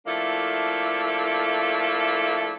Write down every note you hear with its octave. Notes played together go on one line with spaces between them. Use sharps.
F3 A3 A#3 D4 E4 A4